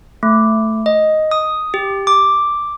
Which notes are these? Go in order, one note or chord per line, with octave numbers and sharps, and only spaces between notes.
A3
D#5
D#6
G4
D6